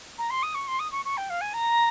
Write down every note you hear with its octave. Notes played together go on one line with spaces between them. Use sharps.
A#5
C6
D#6
C#6
C6
D#6
C#6
C#6
G5
F5
G#5
A#5